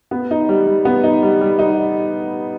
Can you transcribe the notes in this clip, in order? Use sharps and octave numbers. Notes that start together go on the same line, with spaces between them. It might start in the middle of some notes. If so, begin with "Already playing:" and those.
B3
D#4
G3
G3
B3
D#4
G3
G3
D#4